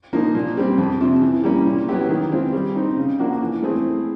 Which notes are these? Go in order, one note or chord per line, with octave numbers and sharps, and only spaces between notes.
F3 A#3 D#4
A#2
G3 C4
F2
C3 F3
E3
G3 A#3 C#4
A#2
F#3 B3 E4 G4
D#3
G#3 C4 F4
G3
C4 D#4
C#3
F3 A#3 D4 F#4
E3
A3 C4 E4 G#4